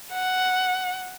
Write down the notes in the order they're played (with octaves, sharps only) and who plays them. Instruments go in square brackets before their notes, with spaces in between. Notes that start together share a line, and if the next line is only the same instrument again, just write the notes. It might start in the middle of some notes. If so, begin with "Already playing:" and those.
[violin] F#5